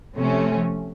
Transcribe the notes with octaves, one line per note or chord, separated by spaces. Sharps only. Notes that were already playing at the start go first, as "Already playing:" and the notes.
C3 F3 A3 C#4